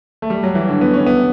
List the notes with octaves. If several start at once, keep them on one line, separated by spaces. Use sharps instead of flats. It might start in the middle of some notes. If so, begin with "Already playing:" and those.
A3
G3
F#3
E3
D3
B3
C#4
B3